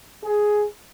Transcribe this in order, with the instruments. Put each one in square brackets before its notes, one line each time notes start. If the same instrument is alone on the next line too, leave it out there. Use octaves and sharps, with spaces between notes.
[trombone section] G#4